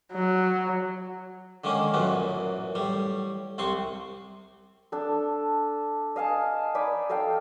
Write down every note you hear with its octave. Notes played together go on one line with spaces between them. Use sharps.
F#3
D3 D#3 G#3 A#3 C#4
A1 F#2 A#2 E3 B3
A2 G3
C2 C3 C4 C6 C#6
D4 A4
D#5 F5 G#5 A5
D#4 D5 G#5 B5
A4 D#5 F5 G5